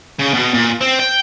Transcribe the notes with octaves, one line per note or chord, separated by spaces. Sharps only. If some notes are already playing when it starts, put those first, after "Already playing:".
C#3
B2
A#2
C4
G5